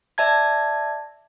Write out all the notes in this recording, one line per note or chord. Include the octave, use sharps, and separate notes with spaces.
D5 E5 A5 G#6